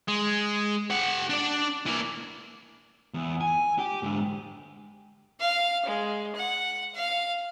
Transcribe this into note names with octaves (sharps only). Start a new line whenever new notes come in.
G#3
G4 F#5
D4 D5
E3 A#3
E2
G#5
G4
G#2 D3
F5
G#3
F#5
F5